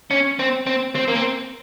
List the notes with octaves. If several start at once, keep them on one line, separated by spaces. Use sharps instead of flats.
C#4
C4
C4
C4
A#3
C4